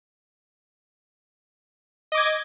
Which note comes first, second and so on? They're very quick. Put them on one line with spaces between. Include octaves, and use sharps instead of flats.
D#5 D6 G#6